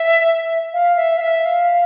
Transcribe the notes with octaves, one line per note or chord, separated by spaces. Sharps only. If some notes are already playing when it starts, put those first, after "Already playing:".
Already playing: E5
F5
E5
F5
E5
F5